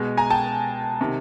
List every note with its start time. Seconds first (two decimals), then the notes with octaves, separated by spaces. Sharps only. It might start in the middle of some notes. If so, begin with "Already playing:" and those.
Already playing: B2 G#3
0.17 G#5 A#5
0.30 G5 A5
1.00 C3 D#3